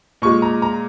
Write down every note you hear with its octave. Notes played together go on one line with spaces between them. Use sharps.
A#2 G#3 C#6
A#5
A#5